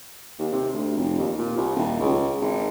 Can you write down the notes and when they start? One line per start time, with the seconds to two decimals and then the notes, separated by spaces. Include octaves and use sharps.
0.39 D#2
0.53 C3
0.74 D2
0.97 F1
1.18 D#2
1.38 A#2
1.57 C2
1.76 D#1
2.00 C#2
2.41 G#1